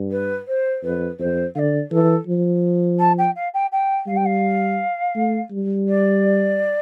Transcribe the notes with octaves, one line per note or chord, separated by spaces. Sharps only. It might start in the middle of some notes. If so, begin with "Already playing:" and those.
Already playing: G2
B4
C5
F2 B4
F2 C5
D3 D5 F5
E3 A4
F3
A5
G5
F5
G5
G5
G3 F5
G5
F5
A3
G3
D5